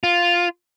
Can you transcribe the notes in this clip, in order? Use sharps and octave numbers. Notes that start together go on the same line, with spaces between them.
F4